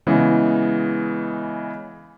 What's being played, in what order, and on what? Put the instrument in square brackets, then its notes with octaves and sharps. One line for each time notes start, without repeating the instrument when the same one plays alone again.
[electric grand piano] C#3 E3 G#3 B3